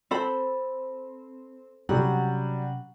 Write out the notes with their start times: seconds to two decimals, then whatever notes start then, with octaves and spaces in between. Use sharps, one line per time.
0.11 C4 A4 C5 B5
1.89 C3 F#3 G3 C#4 F#5